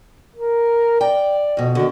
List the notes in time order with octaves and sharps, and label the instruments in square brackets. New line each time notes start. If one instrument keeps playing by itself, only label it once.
[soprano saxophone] A#4
[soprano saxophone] D5 [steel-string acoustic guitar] G5
[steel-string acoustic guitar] F2 B2
[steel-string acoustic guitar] D3 D#3 [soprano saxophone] F#4